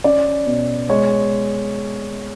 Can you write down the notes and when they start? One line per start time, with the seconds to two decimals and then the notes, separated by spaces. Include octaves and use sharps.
0.04 C#4 D5
0.46 B2
0.89 G#3 C#5